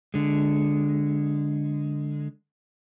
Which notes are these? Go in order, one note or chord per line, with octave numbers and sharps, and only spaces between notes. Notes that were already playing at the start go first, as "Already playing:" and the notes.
D3 G#3